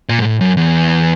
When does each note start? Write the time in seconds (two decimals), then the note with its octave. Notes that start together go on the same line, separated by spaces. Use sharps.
0.09 A#2
0.19 G#2
0.25 A2
0.41 F#2
0.57 E2